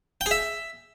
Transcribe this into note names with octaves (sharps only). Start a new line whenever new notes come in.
G5
G#4
E5